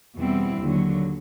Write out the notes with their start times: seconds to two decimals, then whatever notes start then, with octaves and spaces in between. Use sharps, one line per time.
0.17 E2 B2 G3 C4 E4
0.60 D#2 D3 F#3